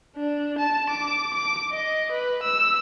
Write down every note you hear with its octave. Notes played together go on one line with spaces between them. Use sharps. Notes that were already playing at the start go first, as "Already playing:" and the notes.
D4
A5
D6
D6
D#5
B4
E6